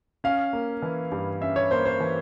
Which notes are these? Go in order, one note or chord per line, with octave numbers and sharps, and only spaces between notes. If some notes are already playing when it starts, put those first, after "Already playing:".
C#4 F5
A#3
E3
G2
C#4 E5
C#5
A#3 C5
C5
E3